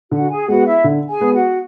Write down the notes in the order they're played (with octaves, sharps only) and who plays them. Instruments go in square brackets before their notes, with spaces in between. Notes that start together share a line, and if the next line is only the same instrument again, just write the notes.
[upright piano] D3 [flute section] F#4 F#5
[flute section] G#4 G#5
[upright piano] G#3 B3 [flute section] F#4 F#5
[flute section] E4 E5
[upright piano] D3
[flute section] G#4 G#5
[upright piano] G#3 B3
[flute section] F#4 F#5